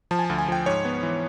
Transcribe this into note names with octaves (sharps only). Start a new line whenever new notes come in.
F3 A5
G#5
A5
D2
G#5
F3 G5
G#2 C#5
B3
E3